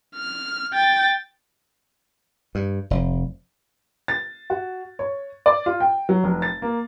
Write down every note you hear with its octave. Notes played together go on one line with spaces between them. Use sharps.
F6
G5 A6
G2
F1
A6
F#4
C#5
D5
F4
G5
F#3
F1
A6
A#3